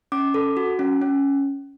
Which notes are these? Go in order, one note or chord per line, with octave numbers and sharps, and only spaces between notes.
C#4 D6
A4
F#4
C#4
C#4